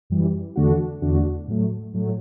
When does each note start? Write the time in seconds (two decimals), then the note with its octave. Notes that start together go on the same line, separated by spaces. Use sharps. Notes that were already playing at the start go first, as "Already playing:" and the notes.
0.10 F#2 E3 G3
0.56 E2 D3 A3 D4 F#4
1.02 E2 D3 A3 D4 F#4
1.47 A2 F#3 A3
1.94 A2 F#3 A3